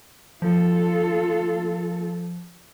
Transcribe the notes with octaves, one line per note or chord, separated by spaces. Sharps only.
F3 F4 A4